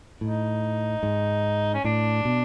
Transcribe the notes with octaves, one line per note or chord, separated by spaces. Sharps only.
A2 D#4
G#2
C#4
A2 D4
B2